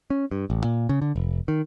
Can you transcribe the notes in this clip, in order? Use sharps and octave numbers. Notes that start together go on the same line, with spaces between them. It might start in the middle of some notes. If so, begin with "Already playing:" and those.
C#4
G2
A1
A#2
C#3
D3
F1
D#3